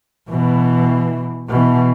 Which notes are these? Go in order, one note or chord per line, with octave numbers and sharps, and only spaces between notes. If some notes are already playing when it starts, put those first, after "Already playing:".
B2 E3
B2 E3